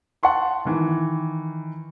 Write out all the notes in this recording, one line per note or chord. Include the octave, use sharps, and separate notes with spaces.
F#5 A5 C6 C#6
D#3 E3